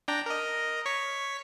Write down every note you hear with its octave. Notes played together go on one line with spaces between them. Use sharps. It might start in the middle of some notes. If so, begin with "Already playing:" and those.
D4 G5 A#5
A#4 D#5
C#5 C#6 B6